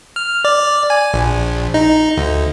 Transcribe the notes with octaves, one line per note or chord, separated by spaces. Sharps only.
F6
D5
G#5
A#1
D#4
D2